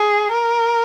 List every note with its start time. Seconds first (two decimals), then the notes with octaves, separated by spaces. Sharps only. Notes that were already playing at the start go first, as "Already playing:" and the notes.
Already playing: G#4
0.32 A#4